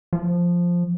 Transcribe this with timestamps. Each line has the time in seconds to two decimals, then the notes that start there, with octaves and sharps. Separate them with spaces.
0.13 F3